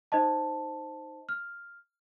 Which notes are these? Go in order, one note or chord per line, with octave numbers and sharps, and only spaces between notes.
D#4 C5 D#5 A5
F6